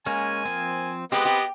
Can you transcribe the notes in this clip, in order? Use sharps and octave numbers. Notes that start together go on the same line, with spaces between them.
G#3 A#3 C#4 G#5
F3 C4
G#3 B3 C4 G4 B4 D#5
G4